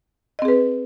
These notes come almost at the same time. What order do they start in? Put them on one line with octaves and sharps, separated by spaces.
D#5 C4 G#4 B4